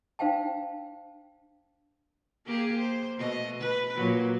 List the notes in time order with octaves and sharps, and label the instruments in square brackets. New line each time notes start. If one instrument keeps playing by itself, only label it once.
[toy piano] D4 C5 F5 G5 A5
[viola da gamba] A#3 G4 G#4
C5
B2 A3 D#5
B4
A#2 F#3